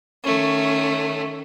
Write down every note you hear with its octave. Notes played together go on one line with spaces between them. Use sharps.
D#3 A3 C#4